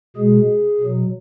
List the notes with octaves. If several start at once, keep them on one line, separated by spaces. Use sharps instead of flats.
B2 G#3 G#4
B2 F#3